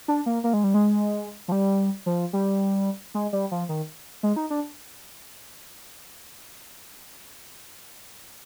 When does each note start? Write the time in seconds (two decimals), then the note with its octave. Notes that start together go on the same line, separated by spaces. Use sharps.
0.08 D4
0.26 A#3
0.44 A#3
0.53 G#3
0.64 G3
0.74 G#3
1.48 F3
1.52 G3
2.06 F3
2.33 G3
3.14 G#3
3.33 G3
3.51 F3
3.69 D#3
4.23 G#3
4.36 D#4
4.50 D4